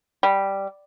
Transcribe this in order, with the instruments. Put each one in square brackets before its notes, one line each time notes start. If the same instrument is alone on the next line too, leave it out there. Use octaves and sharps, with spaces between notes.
[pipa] G3